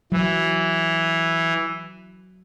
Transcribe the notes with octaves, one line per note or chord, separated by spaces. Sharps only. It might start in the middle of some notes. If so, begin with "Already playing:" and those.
E3 F#3